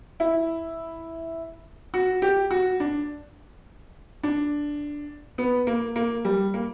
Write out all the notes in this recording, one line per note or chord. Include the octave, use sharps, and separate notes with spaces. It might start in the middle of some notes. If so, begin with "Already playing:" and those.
E4
F#4
G4
F#4
D4
D4
B3
A#3
A#3
G3
A#3